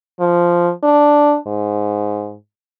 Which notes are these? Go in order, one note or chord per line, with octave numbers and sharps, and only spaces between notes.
F3
D4
G#2